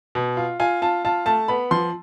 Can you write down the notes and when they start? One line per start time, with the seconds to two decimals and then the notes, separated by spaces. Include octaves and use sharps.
0.15 B2
0.37 F4
0.60 F4 G#5
0.82 F4 A5
1.05 F4 A5
1.26 A3 A5
1.48 B3 B5
1.71 F3 C6